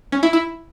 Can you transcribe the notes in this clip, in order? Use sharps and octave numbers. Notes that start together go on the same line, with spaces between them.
C#4
E4
E4